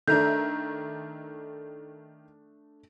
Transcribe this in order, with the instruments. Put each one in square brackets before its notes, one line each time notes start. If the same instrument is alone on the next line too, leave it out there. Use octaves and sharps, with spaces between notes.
[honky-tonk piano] D#3 E5 A#5 [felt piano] A3 D4 [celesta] G6